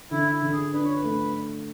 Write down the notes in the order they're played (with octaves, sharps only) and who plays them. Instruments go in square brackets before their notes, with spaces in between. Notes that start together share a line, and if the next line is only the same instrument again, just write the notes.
[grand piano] D3 [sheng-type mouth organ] E4
[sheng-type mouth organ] E4
[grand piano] D3
[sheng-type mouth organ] G#4
[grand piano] D4 [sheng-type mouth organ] B4
[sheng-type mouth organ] C#5
B4
[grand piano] A3